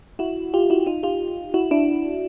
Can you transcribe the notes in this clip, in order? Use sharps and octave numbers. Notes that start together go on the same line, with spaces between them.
E4 F#4
F4 G4
E4 F#4
D#4 F4
F4 G4
E4 F#4
D4 E4